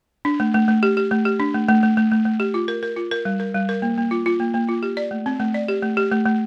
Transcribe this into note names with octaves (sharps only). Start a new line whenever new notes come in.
D4
A3
A3
A3
G4
G4
A3
G4
D4
A3
A3
A3
A3
A3
A3
G4
F4
A#4
A#4
F4
A#4
G3
A#4
G3
A#4
A#3
A#3
F4
F4
A#3
A#3
F4
G4
D5
A3
C4
A3
D5
G4
A3
G4
A3
A3